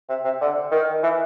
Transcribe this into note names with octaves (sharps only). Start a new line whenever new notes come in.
C3
C3
D3
D#3
E3